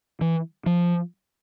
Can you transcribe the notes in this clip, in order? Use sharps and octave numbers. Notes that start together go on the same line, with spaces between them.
E3
F3